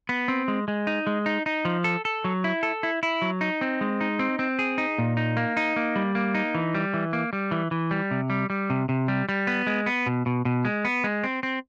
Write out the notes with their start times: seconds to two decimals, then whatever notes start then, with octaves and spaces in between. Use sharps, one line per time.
0.09 B3
0.28 C4
0.48 G#3
0.68 G#3
0.87 D#4
1.07 G#3
1.26 D#4
1.46 D#4
1.65 F3
1.84 A4
2.05 A4
2.24 F#3
2.44 E4
2.63 A4
2.83 E4
3.03 E4
3.22 F#3
3.41 D#4
3.61 C4
3.81 G#3
4.01 D#4
4.19 C4
4.39 C4
4.59 G#4
4.78 D#4
4.98 A#2
5.17 D#4
5.37 A#3
5.57 D#4
5.76 A#3
5.96 G3
6.15 A#3
6.35 D#4
6.55 E3
6.74 G3
6.94 E3
7.13 A#3
7.33 G3
7.51 E3
7.71 E3
7.91 G3
8.11 C3
8.30 G3
8.50 G3
8.70 C3
8.89 C3
9.08 G3
9.29 G3
9.47 B3
9.67 G#3
9.86 B3
10.06 B2
10.26 B2
10.45 B2
10.65 G#3
10.85 B3
11.04 G#3
11.24 C4
11.43 C4